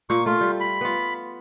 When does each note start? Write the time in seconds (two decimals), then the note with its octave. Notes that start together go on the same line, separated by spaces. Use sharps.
0.10 A#2 A#3 C#6
0.26 A3 F4
0.41 G3
0.60 B5
0.81 B3 F4